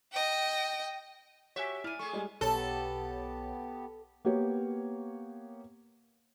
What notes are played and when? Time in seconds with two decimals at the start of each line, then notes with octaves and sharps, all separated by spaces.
0.12 D#5 G5
1.56 F#4 G4 C#5 E5 G#5 F#6
1.84 E4 D5 G#5 F6
1.99 A3 G#4 C#6
2.13 G3 G#3
2.41 B1 B3 G4 A4 C#5
4.25 A#3 B3 G4 C#5